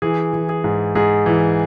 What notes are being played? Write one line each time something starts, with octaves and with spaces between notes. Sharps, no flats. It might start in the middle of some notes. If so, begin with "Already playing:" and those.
E3 G#4
E3
G#4
G#2
G#2 G#4
E3